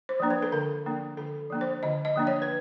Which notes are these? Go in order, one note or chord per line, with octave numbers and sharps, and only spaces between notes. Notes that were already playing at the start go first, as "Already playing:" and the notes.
C5
F3 A#3 D4
B4
A4
D3 A#4
F3 A#3 D4
D3 A4
F3 A#3 D4
C5
D3 D#5
D#5
F3 A#3 D4
C#5
B4